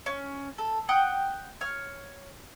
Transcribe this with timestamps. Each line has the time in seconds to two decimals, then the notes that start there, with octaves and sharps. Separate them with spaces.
0.06 C#4
0.58 A4
0.89 F#5 G5 D#6 F#6
1.61 C#5 F6